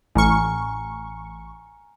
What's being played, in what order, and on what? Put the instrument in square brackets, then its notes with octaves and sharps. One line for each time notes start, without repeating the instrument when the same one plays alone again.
[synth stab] A1 C#6 [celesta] G#5 A#5 F6